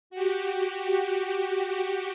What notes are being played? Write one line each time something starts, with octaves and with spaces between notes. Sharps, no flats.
F#4 G4